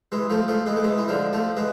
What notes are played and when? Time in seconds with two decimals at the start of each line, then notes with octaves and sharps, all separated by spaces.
0.12 E3 G#3
0.30 F3 A3
0.48 F3 A3
0.66 E3 G#3
0.76 A3
0.84 E3 G#3
0.98 E3
1.08 D3 F3
1.33 F3 A3
1.57 E3 G#3